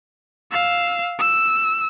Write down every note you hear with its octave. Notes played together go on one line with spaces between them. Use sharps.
F5 E6
E6